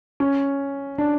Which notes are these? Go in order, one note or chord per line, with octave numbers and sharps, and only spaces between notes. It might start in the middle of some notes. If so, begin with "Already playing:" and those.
C#4
D4